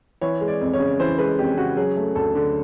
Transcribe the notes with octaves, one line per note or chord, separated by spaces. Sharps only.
E3 C#5
G#3
D5
F2
C#5
C#3
E3 C5
G#3 B4
F2 G4
C#3 F#4
F#3 G#4
A3
D2 A4
D3